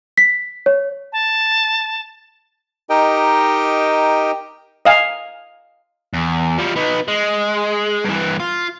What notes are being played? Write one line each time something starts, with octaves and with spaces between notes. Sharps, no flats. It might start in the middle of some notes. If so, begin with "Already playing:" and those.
B6
C#5
A5
D#4 G4 A#4 D#5 G5
D#5 F5 G#5
E2
F3 G3
B3 D#4
G#3
G2 E3
F4